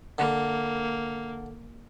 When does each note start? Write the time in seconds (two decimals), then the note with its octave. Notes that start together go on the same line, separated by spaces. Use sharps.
0.18 D3 A#3